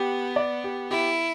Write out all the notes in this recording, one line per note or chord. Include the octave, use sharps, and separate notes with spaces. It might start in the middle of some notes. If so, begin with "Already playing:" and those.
Already playing: B3 G4
D5
G4
E4 G4